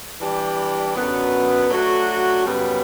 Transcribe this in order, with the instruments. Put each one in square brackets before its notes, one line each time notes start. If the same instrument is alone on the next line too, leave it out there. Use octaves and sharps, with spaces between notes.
[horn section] E3 G3 D4 G4
F#2 D3 F#3 B3
F#3 A3 D4 F#4
F#2 C#3 G3 B3